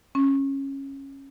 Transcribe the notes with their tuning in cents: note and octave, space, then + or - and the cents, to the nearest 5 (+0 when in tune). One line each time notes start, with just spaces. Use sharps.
C#4 -15